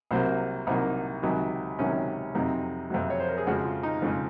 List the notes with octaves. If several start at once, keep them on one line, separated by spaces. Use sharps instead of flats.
C2 C3 F#3 A#3 C5
C2 C3 F#3 A#3 D#4
C#2 C3 D#3 F#3
C#2 C3 D#3 F#3 C#4
F2 C3 F#3 D#4
F2 C3 F#3
C#5
C5
A#4
G#4
F2 C#3 F3 G#3 F#4
F4
D#4
F2 C#3 F3 G#3